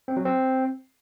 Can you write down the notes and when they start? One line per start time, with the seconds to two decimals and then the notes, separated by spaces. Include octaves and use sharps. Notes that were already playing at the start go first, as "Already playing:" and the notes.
0.08 C4
0.17 F#3
0.25 C4